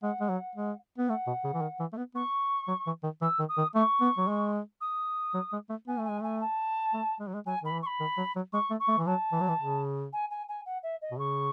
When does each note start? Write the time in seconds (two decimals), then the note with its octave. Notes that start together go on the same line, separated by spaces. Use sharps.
0.02 G#3 F#5
0.20 G#3
0.29 F#3
0.56 G#3
0.98 B3
1.09 A3 F#5
1.27 B2
1.44 C#3
1.54 E3
1.61 D#3
1.80 E3
1.93 A3
1.97 B3
2.15 B3 C#6
2.68 F#3
2.86 E3
3.03 D#3
3.21 E3 E6
3.39 D#3
3.49 D#6
3.57 D#3
3.75 A3 C#6
4.01 B3
4.17 F#3
4.27 G#3
4.81 D#6
5.34 F#3
5.52 G#3
5.70 A3
5.87 B3 G#5
5.98 A3
6.05 G#3 G#5
6.20 A3 G#5
6.40 A5
6.94 A3
7.20 G#3
7.28 F#3
7.34 G#3
7.46 F#3 G#5
7.63 D#3 B5
7.73 E3
7.82 C#6
7.86 B5
8.00 D#3
8.17 F#3
8.36 F#3
8.53 G#3 C#6
8.71 A3
8.80 C#6
8.88 A3
8.98 E3
9.06 F#3 A5
9.32 E3
9.41 F#3
9.48 E3
9.60 C#3
10.13 G#5
10.30 G#5
10.48 G#5
10.66 F#5
10.83 E5
11.01 D#5
11.11 B2
11.19 C#3 C#6